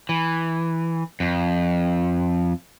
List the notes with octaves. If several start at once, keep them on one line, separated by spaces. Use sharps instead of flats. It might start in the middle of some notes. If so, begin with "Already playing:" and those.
E3
F2